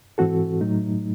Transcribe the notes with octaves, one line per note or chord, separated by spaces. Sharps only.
G#2 E3 C4 F#4 A4
A2 F#3 A3 D#4